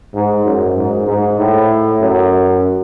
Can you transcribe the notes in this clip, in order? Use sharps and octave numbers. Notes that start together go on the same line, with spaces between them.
G#2
F#2
G#2
G#2
A2
F#2